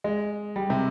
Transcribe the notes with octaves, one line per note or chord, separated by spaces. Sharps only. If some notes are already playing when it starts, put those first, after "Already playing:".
G#3
G3
C3